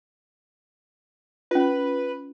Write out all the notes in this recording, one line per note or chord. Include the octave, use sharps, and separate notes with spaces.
C#4 F4 B4